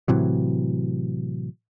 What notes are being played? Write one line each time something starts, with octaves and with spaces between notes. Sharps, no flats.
A2 C3 E3 F#3